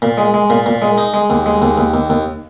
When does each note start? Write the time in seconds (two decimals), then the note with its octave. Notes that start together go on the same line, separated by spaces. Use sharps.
0.02 A#2
0.18 G#3
0.34 G#3
0.50 A#2
0.66 A#2
0.82 G#3
0.98 D#4
1.14 G#3
1.30 D#2
1.46 G#3
1.62 D#2
1.78 D#2
1.94 D#2
2.10 D#2